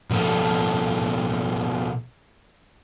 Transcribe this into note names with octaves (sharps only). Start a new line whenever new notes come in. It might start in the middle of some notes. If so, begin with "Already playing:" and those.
B2 F3 A#3 A4